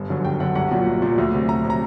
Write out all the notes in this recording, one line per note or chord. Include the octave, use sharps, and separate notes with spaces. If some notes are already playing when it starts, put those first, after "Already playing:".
Already playing: G1
F#2 D3 F#3
G1 G5
F#2 D3 F#3 F#5
C2 F#5
A#2 F#3
C2
A#2 F#3
D2
C3 F#3
D2 A#5
C3 F#3
A#5